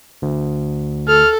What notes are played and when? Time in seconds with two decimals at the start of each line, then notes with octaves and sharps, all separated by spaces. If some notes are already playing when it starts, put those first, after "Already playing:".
0.22 D2
1.08 A4 F6